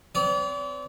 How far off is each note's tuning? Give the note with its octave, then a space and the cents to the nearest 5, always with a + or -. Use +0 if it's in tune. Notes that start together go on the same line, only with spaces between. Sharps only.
C4 -30 D5 -40